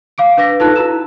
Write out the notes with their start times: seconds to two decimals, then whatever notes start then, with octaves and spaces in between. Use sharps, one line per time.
0.18 F5 D6 D7
0.37 D4 B4 D6 A#6 B6
0.60 D#4 F4 A4 B4 A5 F#6
0.76 E4 F#4 A#5 E6 E7